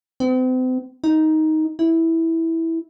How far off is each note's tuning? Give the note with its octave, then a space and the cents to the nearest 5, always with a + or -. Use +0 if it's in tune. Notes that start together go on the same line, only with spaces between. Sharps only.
C4 -40
D#4 +10
E4 -10